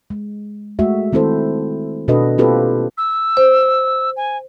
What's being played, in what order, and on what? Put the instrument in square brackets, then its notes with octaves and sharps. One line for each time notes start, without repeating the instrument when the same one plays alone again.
[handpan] G#3
G#3 A3 F#4 E5
D#3 C4 E4 A4 C5
B2 D4 F#4 A4 B4 D#5
A#3 C4 F4 G4 A4 B4
[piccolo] E6
[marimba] C5
[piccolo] G#5